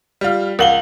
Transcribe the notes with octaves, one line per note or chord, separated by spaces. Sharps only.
G3 F4
C#2 A#4 F5 F#5 F#7 G7